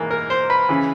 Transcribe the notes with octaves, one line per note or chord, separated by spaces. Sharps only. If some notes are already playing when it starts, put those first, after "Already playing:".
Already playing: G#2 E3 A#3
A#4
C5
B4
C#3 E3